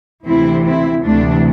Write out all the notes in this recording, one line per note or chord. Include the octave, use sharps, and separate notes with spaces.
D2 C3 E3 C4 E4
C4 E4
D2 C3 E3 A3 D4